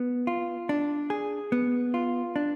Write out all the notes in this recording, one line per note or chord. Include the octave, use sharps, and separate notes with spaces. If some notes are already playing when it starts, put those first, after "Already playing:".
Already playing: B3
F4
D4
G#4
B3
F4
D4